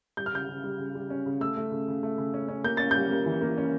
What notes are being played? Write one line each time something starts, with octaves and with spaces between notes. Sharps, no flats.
G3 G6
F6
C#3 G6
C#3
G3
C#3
G3
C#4
C#3
A3 E6
A3
C#3
C#3
A3
C#3
C#4
C#4
A#3 G6
C#4 A6
G3 G6
A#3
E3
A#3
C#4